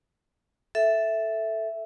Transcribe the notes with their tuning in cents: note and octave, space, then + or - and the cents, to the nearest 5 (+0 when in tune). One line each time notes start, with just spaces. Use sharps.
A4 +0 E5 +0